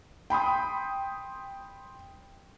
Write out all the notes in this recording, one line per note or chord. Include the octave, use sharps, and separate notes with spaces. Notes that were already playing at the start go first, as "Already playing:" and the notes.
G5 B5 C6 D#6